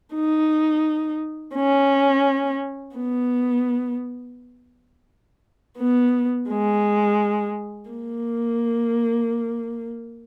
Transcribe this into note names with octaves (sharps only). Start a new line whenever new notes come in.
D#4
C#4
B3
B3
G#3
A#3